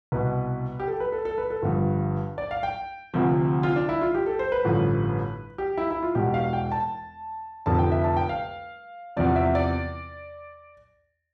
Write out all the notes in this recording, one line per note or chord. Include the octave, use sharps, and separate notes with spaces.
C2 B2 B4
G4
A4
B4
A4
A4
B4
A4
G1 G2 F3
D5
F5
G5
D2 C3 F3
F4
D4
E4
F4
G4
A4
C5
B4
A1 G2 D3 F3
G4
E4
E4
F4
E1 E2 B2 G4
F5
G5
A5
F1 F2 D3 F3 A5
G5
E5
A5
G5
F5
E2 C3 F3 D5
E5
D5